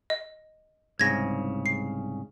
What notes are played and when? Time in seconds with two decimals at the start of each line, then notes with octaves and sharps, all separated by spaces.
0.10 D#5
0.99 C2 G#2 C#3 G#6 A#6
1.66 C7